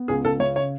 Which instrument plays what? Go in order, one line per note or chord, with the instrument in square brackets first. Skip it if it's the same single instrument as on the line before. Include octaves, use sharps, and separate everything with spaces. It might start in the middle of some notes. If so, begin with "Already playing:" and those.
Already playing: [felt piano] B3
[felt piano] C#2 [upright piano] G#4
[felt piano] C#2 [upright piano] A4
[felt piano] C#3 [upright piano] C#5
[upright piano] C#5